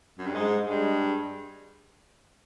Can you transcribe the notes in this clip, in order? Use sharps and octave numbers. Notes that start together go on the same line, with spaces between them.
F#2
G2
G#2 G#3
G2 G#3